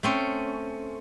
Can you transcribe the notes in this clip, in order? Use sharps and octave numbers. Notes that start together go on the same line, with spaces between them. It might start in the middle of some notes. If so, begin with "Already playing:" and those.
A3 C4 C#4